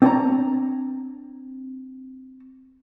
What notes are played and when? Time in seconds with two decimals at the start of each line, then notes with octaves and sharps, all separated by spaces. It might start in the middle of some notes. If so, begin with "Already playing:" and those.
0.02 C4 D4 C#5 F5 A5 A#5